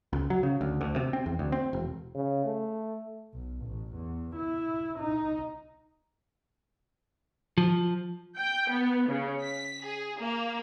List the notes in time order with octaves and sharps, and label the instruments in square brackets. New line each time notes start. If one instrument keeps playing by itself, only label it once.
[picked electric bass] C#2
F#3
C#3
D2
D2
C3
C4
E2
D2
C4
E1
[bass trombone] C#3
A3
[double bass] B1
A1
E2
E4
D#4
[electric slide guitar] F3
[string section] G5
B3
C#3
B6
G#4
A#3